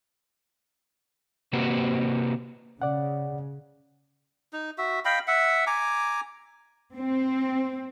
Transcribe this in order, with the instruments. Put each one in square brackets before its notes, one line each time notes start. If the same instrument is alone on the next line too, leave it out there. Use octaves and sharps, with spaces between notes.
[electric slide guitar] C3 A#3 C4 F#4 G4 B4
[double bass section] C#3 [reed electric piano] D5 F#5
[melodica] D#4
F#4 E5
D#5 F5 G5 B5
E5 F#5
G#5 A#5 D6
[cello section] C4